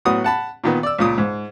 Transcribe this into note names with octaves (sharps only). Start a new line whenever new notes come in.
A2 F#3 B3 F#4 D#6
F#5 A5 B5
A#2 D#3 B3
D5 E6
C#2 A#2 D#6
G#2